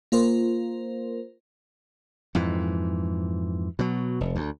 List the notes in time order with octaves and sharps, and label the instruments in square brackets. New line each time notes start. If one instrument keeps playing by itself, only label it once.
[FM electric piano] A#3 F4 A#4 C5
[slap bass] F2 G#2 E3
B2 F#3
F1
D2